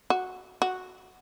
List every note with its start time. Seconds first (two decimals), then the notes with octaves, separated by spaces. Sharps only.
0.10 F#4
0.62 F#4